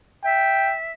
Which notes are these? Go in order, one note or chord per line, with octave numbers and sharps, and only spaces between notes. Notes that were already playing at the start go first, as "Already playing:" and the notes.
E5 G5